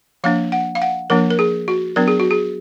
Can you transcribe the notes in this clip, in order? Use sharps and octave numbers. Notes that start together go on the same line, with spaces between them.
F3 A#3 D4 F5
F#5
F5
F#5
F3 A#3 D4 A#4
A#4
G#4
F#4
F#3 B3 D4 A#4
G#4
F#4
G#4